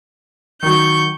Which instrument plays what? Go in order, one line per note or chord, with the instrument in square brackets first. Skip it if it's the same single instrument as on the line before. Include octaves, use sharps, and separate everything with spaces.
[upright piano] D#3 F#3 [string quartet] C#6 G6